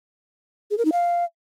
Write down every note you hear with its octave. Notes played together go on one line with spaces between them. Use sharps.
G#4
A#4
D#4
F5